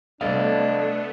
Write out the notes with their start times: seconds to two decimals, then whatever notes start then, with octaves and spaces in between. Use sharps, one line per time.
0.21 C3 G3 A3 B3 D4 A4 D#5 F5